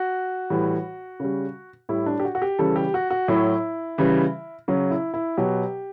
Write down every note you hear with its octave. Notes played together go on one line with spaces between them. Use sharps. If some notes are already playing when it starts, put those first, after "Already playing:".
Already playing: F#4
A2 E3 G3
C#3 G3
A2 G3 E4
D4
G4
F#4
F#4
G4
C#3 E3 G3 A4
G4
F#4
F#4
A2 F#3 E4
C#3 E3 G3
C#3 F#3
E4
E4
B2 F#3 G4